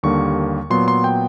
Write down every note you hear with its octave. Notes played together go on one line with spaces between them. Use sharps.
D#2 D3 G3 A#3 C#6
A#2 F#3 B3 C6
C6
G5